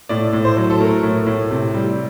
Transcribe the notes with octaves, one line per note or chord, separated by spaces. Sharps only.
A2 D5
A2
C5
F#3
A4
A3 A#4
A2
A2
C3
G3